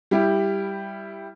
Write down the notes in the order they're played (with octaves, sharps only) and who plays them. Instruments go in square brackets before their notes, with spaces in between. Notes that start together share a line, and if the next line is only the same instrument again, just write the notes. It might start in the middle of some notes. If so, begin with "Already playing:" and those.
[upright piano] G3 E4 G4